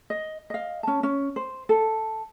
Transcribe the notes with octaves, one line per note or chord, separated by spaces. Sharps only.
D#5
D#5 F5
C#4 A5
C#4
C5
A4